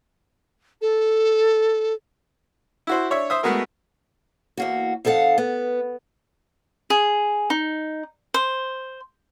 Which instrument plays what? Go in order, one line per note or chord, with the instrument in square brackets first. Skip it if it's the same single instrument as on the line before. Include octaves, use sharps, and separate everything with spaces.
[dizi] A4
[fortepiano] E4 F#4 C5
D4 C#5 E5
C5 E5 D#6
G#3 A3 B3 F#4 G#4 A#4
[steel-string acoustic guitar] E2 A#3 F#4
F2 D#4 A4 F5 F#5
B3
[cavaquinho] G#4
D#4
C5